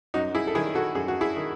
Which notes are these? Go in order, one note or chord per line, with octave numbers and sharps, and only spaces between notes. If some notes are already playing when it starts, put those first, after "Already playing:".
F#2 D#4 F#4
E4 G#4
A4
D#3 E4 G#4
F#4 A4
F#2 G#4
F#4
E4 G#4
D#3